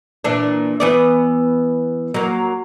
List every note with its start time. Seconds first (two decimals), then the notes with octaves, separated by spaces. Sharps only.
0.24 A#2 E3 D4
0.80 E3 B3 D5
2.14 F#3 A#3